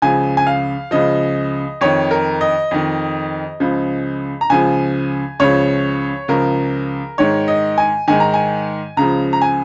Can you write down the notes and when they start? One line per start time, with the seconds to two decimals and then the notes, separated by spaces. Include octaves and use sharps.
0.02 C#2 C#3 F3 G#5
0.37 G#5
0.47 F5
0.91 C#2 C#3 F3 D#5
1.81 F2 D#3 C#5
2.11 A#4
2.41 D#5
2.71 F2 D#3
3.60 C#2 C#3 F3
4.41 A#5
4.50 C#2 C#3 F3 G#5
5.40 C#2 C#3 F3 C#5
6.28 C#2 C#3 F3 A#4
7.18 G#2 D#3 C#5
7.48 D#5
7.78 G#5
8.08 G#2 D#3 G#5
8.20 A#5
8.34 G#5
8.97 C#2 C#3 F3 A#5
9.33 A#5
9.42 G#5